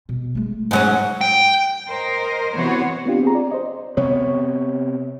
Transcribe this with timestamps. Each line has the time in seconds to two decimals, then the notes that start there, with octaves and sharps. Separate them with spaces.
0.09 B2
0.35 G#3 A3
0.71 G#2 F#3 C#4
1.21 G5
1.90 A#4 C5 D#5
2.53 C3 E3 B3 F#4 C5 C#5
3.06 B3 C4 D4 F4 G4
3.23 C4 G#4 A#5
3.35 D5
3.51 C5 D#5
3.97 C3 B3 C#5